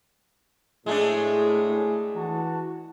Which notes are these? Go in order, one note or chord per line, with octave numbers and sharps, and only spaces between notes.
A2 G#3 A3 D4 G#4
E3 F#4 A5